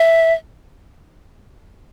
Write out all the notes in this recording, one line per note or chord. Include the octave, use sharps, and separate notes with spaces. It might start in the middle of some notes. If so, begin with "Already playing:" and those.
Already playing: E5